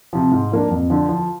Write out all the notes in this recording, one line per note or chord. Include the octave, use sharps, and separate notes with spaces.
C3 F3
G#2
F3 A#3 D4
F2
D3 F3
F3